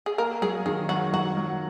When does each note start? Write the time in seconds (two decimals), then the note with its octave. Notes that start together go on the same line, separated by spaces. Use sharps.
0.06 G#4
0.18 A#3 A#4
0.42 F#3 G#4
0.66 D#3 G#4
0.89 F#3 F#4
1.13 F#3 F#4
1.37 F#3